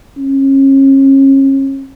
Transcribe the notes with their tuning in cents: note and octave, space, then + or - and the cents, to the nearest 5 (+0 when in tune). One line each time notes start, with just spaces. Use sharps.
C#4 -35